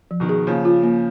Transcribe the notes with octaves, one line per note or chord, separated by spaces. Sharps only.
F3
B2 D#3
G#4
C#3 F3 A#3
F4
A#3